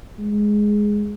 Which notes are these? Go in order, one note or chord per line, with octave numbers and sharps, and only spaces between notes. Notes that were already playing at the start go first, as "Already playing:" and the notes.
G#3